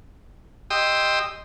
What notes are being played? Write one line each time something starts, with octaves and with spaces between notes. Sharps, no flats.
G4 D#5 G5 C6 D#6 E6